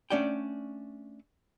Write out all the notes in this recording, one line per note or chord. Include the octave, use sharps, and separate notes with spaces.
A3 C#4 D4 D5 F#5 G5